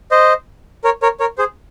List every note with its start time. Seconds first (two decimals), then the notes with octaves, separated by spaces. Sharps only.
0.11 C5 D#5
0.84 A#4 C#5
1.02 A#4 C#5
1.20 A#4 C#5
1.38 G#4 C5